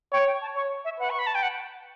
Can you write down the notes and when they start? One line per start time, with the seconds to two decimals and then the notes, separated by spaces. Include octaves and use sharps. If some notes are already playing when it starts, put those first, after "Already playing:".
0.13 C#5 G5
0.27 G5
0.41 A5
0.56 C#5 C#6
0.85 E5
0.99 B4 F#5
1.10 C#6
1.19 B5
1.27 A5
1.35 G5
1.43 F#5